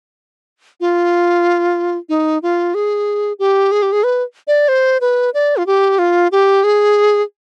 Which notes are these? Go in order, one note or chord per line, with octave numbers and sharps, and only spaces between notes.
F4
D#4
F4
G#4
G4
G#4
G4
G#4
B4
D5
C5
B4
D5
F4
G4
F4
G4
G#4